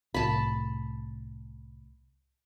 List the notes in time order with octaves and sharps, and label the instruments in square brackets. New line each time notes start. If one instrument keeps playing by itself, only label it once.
[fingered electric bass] C2 A2 [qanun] A5 B5